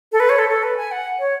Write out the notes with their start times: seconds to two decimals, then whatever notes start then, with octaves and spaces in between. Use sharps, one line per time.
0.12 A4
0.20 B4
0.29 C#5
0.39 A4
0.49 A4
0.63 B4
0.77 G#5
0.91 F#5
1.19 C#5